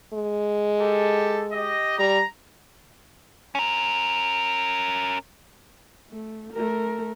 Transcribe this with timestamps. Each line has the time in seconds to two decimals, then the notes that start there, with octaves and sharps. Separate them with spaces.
0.13 G#3
0.80 G4 A4
1.52 G4 D#5
1.99 G3 A#5
3.55 C#4 A#4
6.10 A3
6.53 A3 A#4